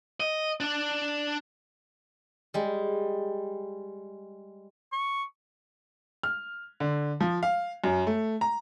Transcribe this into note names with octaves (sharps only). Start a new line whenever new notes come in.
D#5
D4 D5
G3 G#3
C#6
F6
D3
F3
F5
F#2
A3
A#5